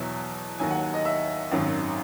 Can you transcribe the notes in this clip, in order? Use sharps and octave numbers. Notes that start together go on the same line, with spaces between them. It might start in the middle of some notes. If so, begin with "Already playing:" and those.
Already playing: E2 B2 F#3 E5
D#2 D#3 F#3 G#5
F#5
D#5
E5
G#1 F#2 D#3 F#3